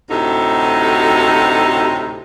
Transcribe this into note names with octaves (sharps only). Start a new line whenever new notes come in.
D2 A2 C3 D#4 F#4 A4